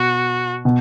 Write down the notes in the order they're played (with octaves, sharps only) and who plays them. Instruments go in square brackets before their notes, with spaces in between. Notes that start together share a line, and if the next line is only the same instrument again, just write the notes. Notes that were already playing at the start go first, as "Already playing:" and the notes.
Already playing: [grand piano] B2 [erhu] F#4
[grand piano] B2